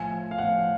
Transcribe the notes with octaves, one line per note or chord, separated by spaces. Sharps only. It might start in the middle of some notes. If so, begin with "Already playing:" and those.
Already playing: A2 F3 G#5
F5
A2 F3 F#5